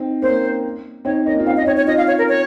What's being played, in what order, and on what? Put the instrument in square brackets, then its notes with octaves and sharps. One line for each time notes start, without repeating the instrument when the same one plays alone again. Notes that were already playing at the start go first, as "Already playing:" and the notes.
Already playing: [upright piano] C4 D#4
[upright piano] A#3 C#4 [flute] C5
[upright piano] C4 D#4 [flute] C#5
[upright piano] A#3 C#4 [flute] D#5
[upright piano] F4
[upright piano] C4 D#4 [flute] F5
[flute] D#5
[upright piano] C#4
[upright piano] C4 D#4 [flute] C#5
[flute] C#5
[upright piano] C#4 F4 [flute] D#5
[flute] F5
C#5
A#4
C#5